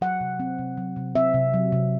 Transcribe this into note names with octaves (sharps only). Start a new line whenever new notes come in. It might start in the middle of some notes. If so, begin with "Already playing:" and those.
F#3 F#5
C3
C4
C3
F#3
C3
C4 E5
C3
F#3
C3